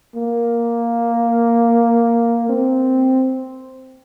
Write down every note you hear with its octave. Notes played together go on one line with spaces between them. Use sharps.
A#3
C4